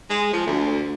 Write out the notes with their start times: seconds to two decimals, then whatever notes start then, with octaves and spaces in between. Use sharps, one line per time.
0.10 G#3
0.33 F3
0.46 D2